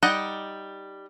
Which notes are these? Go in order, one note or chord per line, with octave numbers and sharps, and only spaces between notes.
G3 D#4 D5 D#5 F#5